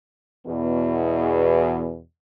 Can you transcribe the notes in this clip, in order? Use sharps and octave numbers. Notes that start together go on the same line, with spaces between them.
E2 B2